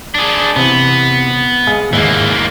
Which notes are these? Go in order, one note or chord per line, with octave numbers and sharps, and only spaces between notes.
D4 G#4
C3 E3 B3
G#3 G#4 F5
D#2 G#2 E3 A#3